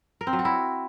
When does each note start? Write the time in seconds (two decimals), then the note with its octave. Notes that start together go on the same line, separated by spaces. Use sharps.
0.21 A#4
0.27 C4
0.33 F#3
0.39 F#4
0.45 E4